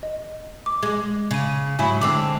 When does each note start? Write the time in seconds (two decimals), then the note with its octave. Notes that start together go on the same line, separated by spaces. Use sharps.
0.03 D#5
0.66 D6
0.83 G#3 D6 G#6
1.31 C#3 G#6 D#7
1.79 G#2 F#3 E4 G#5 B5
2.01 D3 G#3 C4 D6 E6